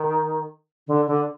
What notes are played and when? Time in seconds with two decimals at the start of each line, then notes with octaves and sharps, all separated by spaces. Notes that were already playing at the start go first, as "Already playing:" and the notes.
Already playing: D#3
0.87 D3
1.07 D3